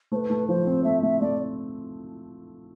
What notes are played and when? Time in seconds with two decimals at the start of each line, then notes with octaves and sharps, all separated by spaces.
0.12 A3 C5
0.16 B4
0.30 A3
0.49 F3 C5
0.67 C4
0.84 A3 E5
1.02 A3 E5
1.21 A3 D5